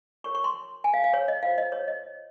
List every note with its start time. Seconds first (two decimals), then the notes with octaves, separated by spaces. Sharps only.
0.24 F#4 A#4 C#5 C#6
0.35 C#6
0.44 C6
0.84 G#5
0.94 F5
1.04 F5
1.14 C#5
1.28 D#5
1.43 F4 C5 F5
1.58 D#5
1.72 C#5
1.88 D#5